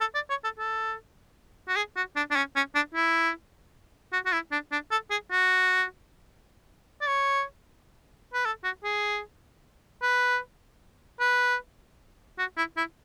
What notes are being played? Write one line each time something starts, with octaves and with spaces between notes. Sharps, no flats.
A4
D5
C#5
A4
A4
F#4
G#4
F#4
D4
D4
C#4
C#4
D4
E4
F#4
F#4
E4
D4
D4
A4
G#4
F#4
D5
C#5
B4
A4
F#4
G#4
B4
B4
F#4
E4
E4